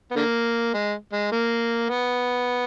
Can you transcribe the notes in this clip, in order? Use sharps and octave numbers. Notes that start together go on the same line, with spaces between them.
B3
D3 A#3
G#3
G#3
A#3
B3